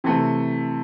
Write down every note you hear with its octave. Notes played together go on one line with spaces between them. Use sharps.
C3 E3 A3